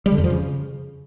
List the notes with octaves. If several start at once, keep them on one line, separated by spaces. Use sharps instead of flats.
G3
D3
F2
F3
C#3